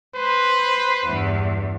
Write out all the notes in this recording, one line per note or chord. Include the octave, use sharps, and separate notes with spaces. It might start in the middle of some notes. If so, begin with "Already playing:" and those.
B4 C5
E2 G2